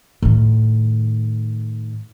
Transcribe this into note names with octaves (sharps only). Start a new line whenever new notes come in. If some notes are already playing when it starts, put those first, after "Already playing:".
A2 D#3